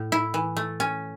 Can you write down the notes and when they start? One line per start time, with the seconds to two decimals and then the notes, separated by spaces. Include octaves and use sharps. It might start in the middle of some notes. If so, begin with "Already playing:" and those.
Already playing: A2
0.12 E4
0.34 E3
0.57 A3
0.80 C#4